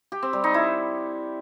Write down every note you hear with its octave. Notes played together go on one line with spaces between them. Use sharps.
G4
C4
G3
D#4
E4